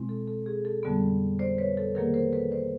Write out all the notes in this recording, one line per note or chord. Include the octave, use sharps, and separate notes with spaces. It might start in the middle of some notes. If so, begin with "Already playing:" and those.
Already playing: B2 G#3 C4 E4
A4
A4
G#4
A4
F2 D3 G3 B3
C5 D5
B4 C#5
A4
B4
D#3 F#3 A#3 G#4 A#4
A#4 C5
A4 B4
C5 D5